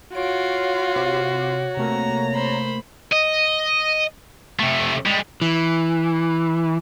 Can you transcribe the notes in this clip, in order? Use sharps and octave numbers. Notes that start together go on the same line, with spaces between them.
F4 F#4 C#5 D7
C3 D6
C3 A3 A#3 A#5
C5 B5
D#5
C3 A3
G3 G#3
E3